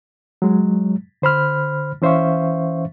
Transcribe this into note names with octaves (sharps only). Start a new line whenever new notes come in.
F#3 G#3
D3 C5 B5 F6
E3 C#4 C5 E5 F5 C#6